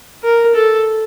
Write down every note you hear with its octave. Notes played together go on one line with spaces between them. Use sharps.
A#4
A4